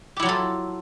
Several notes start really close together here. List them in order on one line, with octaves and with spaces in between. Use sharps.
G4 E4 F#3 F4 A4